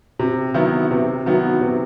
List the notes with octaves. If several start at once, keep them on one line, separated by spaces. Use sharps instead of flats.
C3
D#3 F#3 B3 E4
C3
D#3 F#3 B3 E4
C3